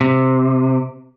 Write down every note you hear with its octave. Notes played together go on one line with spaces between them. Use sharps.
C3